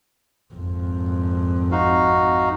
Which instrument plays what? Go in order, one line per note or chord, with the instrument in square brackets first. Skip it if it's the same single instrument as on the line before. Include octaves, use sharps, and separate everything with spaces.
[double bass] G#1 F2
[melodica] D#4 F#4 F5